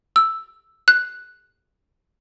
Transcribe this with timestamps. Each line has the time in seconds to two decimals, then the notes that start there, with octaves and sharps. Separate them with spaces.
0.16 E6
0.88 F#6